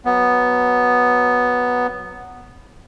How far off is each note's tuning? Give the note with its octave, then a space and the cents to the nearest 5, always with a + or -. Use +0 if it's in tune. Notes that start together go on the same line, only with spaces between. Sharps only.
F#3 +0 B3 +0